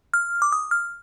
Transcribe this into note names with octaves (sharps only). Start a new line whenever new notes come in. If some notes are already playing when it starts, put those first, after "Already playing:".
F6
D6
D#6
F6